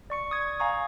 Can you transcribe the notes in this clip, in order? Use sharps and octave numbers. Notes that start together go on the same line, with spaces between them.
D5 C#6 C#7
D#6 G#6
F5 G#5 A#5 C#6 D#6